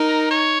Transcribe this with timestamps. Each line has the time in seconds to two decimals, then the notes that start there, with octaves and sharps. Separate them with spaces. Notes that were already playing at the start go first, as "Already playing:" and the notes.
Already playing: D#4 A#4
0.31 C#5